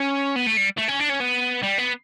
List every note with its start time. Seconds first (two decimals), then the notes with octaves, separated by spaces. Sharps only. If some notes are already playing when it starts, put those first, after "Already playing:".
Already playing: C#4
0.36 B3
0.47 A3
0.57 G3
0.78 A3
0.89 C#4
1.00 D4
1.10 C#4
1.21 B3
1.63 G3
1.78 B3